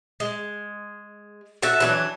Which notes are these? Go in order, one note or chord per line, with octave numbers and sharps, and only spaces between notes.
G#3
F#4 A4 E5
E3 F#3 D4